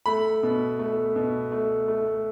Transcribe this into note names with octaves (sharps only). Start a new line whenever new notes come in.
A3 B5
B2
A3
B2
A3
A3